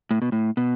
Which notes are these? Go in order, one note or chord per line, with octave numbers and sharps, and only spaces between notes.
A2
B2
A2
B2